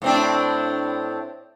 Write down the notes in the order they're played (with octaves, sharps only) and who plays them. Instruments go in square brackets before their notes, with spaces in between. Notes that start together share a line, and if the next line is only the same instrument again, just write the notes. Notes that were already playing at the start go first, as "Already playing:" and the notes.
[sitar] A2 C4 D4